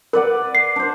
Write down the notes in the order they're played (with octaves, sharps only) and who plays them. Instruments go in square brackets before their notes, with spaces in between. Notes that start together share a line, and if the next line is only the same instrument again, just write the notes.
[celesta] A#4 [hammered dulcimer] B4 D5 F#5
[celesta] C7
[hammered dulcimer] D4 C5